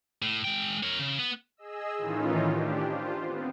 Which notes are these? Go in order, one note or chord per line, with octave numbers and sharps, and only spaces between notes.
A2
G#3 G5
A#4 C#5
C#3
B3
G#4 D#5 E6
A2 D#3 E3 C#4 D#4 F4
D4 G4
F4 C5
B3 C4